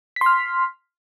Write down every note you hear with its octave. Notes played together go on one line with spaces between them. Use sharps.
C6 F6 B6